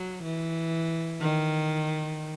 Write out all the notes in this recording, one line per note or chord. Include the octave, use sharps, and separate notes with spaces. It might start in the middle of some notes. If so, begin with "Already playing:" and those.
Already playing: F#3
E3
D#3